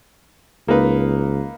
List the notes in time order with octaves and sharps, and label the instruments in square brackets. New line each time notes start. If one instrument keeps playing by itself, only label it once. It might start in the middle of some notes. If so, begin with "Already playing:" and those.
[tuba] C#2 [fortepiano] A#3 D#4 B4